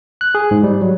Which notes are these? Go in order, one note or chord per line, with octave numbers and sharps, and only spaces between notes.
F#6
G#4
G#2
G3
F#3